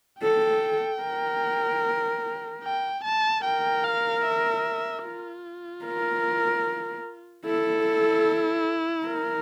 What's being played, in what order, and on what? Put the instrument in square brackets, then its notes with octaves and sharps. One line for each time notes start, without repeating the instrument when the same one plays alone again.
[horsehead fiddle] A4 [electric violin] G5
[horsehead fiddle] A#4
[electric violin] G5
A5
[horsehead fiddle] A#4 [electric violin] G5
[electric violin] F5
E5
F4
[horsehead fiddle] A#4
[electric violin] E4 [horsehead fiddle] A4
[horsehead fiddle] A#4